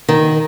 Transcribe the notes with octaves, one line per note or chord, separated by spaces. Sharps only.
D#3